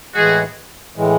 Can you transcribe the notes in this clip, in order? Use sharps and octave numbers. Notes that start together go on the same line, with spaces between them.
A2 E3 G#3 F#4 G#4
A2 E3 G#3